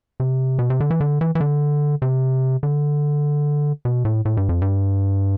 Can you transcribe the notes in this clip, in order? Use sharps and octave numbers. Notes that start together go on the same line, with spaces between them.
C3
B2
C3
D3
E3
D3
E3
E3
D3
C3
D3
B2
A2
A2
G2
F2
G2